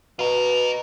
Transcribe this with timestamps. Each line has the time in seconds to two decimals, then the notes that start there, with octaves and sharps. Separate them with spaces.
0.19 B2 F4 A#4